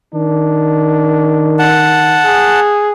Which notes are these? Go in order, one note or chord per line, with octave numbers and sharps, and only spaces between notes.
D#3 D4
F#5 A5
G#4